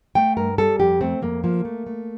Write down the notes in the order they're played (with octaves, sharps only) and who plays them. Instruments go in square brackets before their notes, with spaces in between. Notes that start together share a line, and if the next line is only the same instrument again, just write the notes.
[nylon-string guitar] A3 G5
G2 A#4
G3 A4
F2 G4
A3 C4
F2 A#3
F3 A#3
A3
A3